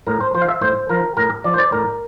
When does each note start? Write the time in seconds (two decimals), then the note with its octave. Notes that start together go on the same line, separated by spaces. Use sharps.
0.07 A2 A#4
0.21 C5
0.34 F3 C5
0.42 F5
0.48 E5
0.61 A2 C5
0.89 F3 A#4
1.17 A2 A#4
1.44 F3 D5
1.54 C5
1.58 D5
1.72 A2 A#4